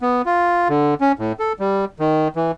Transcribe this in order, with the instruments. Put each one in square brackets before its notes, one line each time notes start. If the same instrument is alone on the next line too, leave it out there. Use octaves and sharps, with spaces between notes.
[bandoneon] B3
F4
D3
C#4
A2
A4
G3
D#3
E3